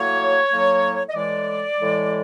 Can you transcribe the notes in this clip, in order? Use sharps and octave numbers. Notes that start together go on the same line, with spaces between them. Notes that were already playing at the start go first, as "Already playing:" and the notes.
Already playing: A2 F#3 A#3 C#5
A2 F#3 A#3
D#5
A2 E3 G#3 D5
A2 E3 G#3